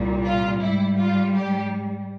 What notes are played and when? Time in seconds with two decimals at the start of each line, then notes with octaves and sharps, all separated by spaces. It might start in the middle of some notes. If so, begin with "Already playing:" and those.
Already playing: C2 A#2 G3
0.25 F4
0.61 G#2 G3 E4
0.98 F4
1.34 G4